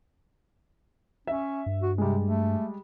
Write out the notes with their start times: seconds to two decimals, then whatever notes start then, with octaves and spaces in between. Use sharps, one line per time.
1.27 C#4 E5
1.66 G2
1.82 F#4
1.98 C3 G3 G#3
2.24 A3